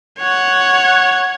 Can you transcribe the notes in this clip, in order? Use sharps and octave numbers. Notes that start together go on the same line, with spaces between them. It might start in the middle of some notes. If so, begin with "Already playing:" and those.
C#5 F#5